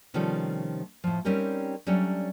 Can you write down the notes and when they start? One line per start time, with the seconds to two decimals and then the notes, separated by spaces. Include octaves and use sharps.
0.14 C3 D#3 F3 G3 A3 C#4
1.04 A2 F3
1.25 G3 C4 C#4 D#4 G4 A#4
1.87 F#3 G3 A3 C#4 D4